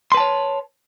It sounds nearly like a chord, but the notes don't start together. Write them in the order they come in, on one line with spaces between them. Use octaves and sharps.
C6 B4 A5 C#5